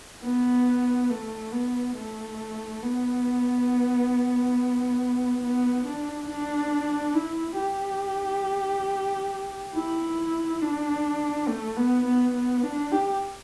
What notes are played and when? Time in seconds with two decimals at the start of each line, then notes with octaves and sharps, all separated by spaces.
0.23 B3
1.10 A3
1.52 B3
1.96 A3
2.83 B3
5.42 B3
5.85 D4
6.29 D4
7.15 E4
7.58 G4
9.74 E4
10.61 D4
11.48 A3
11.76 B3
12.05 B3
12.34 B3
12.63 D4
12.92 G4